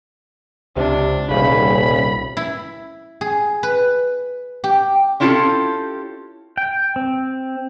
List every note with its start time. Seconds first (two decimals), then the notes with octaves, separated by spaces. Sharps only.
0.77 C#2 C3 D4
1.30 D#1 C2 C#3 B5
2.37 E4
3.21 G#4
3.63 B4
4.64 G4
5.20 C4 C#4 E4 F4 G4 A4
6.57 G5
6.96 C4